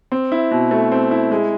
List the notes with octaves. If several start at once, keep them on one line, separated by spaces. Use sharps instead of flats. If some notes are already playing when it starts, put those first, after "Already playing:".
C4
E4
B2
A3
C4
E4
G#3